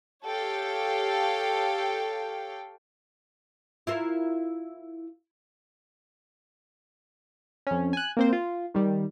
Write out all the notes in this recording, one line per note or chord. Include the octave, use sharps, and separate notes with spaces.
G4 A4 C#5 F5 G5
E4 F4 A#4
F2 C#4
G#5 F#6
A#3 C4 C5
F4
D#3 G3